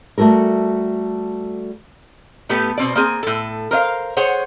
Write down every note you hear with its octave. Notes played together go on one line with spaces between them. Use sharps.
G3 A3 F#4 A4 A#4
A2 A3 B3 G4
B2 C4 D5
A#3 C4 G#4 G#5
A2 A4
A#4 C5 D5 F5
G#4 C5 C#5 F#5